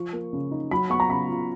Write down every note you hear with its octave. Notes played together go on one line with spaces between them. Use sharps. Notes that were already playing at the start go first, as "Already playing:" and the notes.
Already playing: F3 C#6
A#3
C#3
D#4
F#3 B5
B3 C#6
A#5
C#3 B5
F4